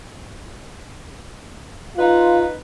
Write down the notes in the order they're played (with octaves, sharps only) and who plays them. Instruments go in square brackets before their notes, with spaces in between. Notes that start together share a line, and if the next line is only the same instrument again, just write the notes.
[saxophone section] D#4 B4 [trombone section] F4